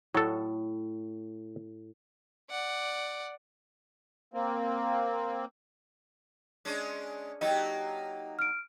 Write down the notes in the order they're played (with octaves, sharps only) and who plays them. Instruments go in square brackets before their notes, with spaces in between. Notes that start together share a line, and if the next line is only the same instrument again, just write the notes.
[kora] A2 [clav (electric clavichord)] F#3 A4
[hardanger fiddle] D5 F#5
[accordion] A#3 C4
[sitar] G#3 C#4 D4
[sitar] F#3 A#3 D#4 [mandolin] G4 A5 [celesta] D#5
[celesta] F6 D7